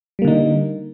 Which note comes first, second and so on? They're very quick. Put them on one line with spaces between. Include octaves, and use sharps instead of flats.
G3 A#3 D3 D#4